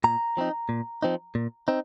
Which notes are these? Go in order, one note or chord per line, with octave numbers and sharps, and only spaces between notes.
A#2 A#5
F3 C4 D#4
A#2
F3 C4 D#4
A#2
C4 D#4